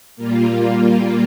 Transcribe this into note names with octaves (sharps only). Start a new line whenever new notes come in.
A#2 G3 A#3 F4